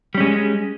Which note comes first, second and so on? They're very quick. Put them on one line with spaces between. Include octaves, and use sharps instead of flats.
G3 C#4 G#3